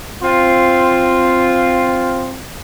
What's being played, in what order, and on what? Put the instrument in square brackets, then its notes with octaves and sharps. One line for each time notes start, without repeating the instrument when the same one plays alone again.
[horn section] C4 F4